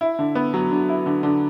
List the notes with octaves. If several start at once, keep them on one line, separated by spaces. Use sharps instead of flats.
E4
D3
B3
F#3
D3
E4
D3
D3